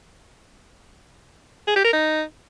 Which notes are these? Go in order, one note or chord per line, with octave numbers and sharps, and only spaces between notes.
G#4
G4
A#4
D#4